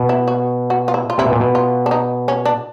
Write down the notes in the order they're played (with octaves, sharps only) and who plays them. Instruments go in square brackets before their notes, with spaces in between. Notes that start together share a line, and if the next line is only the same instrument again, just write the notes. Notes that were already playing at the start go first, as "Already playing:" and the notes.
Already playing: [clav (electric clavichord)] B2
[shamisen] E4
F#4
F#4
F4
E4
F4
[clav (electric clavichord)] C3 [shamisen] E4
[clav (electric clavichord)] B2
A#2
B2
[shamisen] F4
D4
D#4
C#4
D4